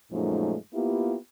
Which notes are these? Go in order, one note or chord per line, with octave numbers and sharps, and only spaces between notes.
F#2 A#2 F3 G#3 A3 D#4
A#3 B3 E4 F4 G4